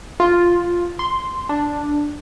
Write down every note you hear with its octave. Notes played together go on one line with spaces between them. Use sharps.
F4
C6
D4